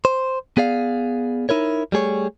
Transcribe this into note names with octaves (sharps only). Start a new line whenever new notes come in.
C5
B3 G#4 D5 F5
D#4 E4 A#4 C#5
G3 A3 G#4 C#5